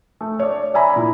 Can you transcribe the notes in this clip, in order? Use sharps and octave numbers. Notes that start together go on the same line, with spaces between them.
A3
C#5 D5
D5 E5 G#5 A#5 B5
A#2 E4